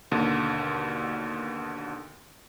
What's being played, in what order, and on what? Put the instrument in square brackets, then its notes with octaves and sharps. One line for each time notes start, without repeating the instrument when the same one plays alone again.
[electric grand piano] D#2 B2 D3